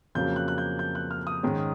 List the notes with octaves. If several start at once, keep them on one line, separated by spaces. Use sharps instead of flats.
F2 C#3 F#3 A#3 C#4 G6
F#6
F#6
G6
G6
F#6
F6
D#6
G#2 D#3 G#3 C#4